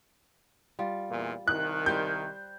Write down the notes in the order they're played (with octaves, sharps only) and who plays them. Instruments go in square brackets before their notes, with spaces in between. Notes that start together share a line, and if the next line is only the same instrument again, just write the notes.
[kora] G3 F4
[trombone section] E2 A#2
[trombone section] C2 D#3 [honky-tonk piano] F#6
[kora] G3 G4 C5 [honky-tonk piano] G6